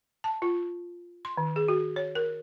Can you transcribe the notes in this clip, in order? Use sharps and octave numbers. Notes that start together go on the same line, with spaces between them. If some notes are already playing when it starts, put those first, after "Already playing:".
A5
F4
C6
D#3
G#4
F#4
C#5
A#4